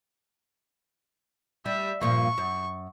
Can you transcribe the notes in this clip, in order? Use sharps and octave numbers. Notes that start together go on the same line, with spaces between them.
G3 E5
G2 A#2 F3 C#6
F#2